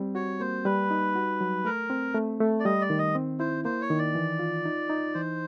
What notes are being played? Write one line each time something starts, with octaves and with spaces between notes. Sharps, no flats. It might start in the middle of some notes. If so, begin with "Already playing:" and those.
Already playing: G3 C4
F#4 C#5
A#3 C5
G3 B4
D#4
F#4
F#3
A3 A#4
C4
A3
A3
D5
G3 D#5
D5
D#3
D#5
C4
E4 C5
A#3 C5
C#5
D#3
D5
E3
F4
D#4
D#4
E3 C5